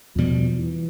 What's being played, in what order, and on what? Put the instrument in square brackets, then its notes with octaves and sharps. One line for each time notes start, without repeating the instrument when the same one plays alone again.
[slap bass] E2 B2 G3 [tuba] F3
[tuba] E3